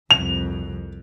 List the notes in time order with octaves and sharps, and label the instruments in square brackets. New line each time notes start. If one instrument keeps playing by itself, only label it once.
[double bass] C2 F2 [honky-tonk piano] F7